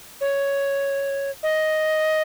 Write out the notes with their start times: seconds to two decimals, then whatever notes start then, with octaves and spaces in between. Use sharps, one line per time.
0.21 C#5
1.43 D#5